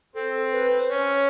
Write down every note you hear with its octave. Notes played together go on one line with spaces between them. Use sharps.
C4 A4
B4
C5
C#4 C#5